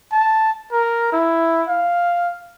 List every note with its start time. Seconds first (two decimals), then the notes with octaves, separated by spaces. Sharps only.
0.12 A5
0.72 A#4
1.12 E4
1.69 F5